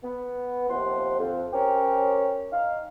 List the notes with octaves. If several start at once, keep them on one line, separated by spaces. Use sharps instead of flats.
B3
D#2 C3 F3 C5 F#5 C6
F2
C#4 G4 A#4 C5 C#5 G5
D#4 F5